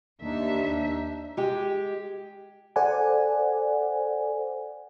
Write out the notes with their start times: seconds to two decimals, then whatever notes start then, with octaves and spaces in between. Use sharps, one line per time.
0.22 D#2 D4 D#4 E5
1.37 G#3 G4
2.76 A4 C5 D5 F#5 G#5